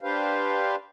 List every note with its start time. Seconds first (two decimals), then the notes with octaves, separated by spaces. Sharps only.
0.01 D4 G4 B4 C5 F5